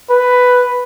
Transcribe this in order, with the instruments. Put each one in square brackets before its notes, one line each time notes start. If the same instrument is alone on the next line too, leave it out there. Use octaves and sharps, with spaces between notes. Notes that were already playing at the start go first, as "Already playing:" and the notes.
[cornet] B4